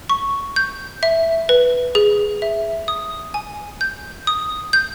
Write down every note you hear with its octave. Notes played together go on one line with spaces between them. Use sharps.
C#6
G6
E5
B4
G#4
E5
D#6
G#5
G6
D#6
G6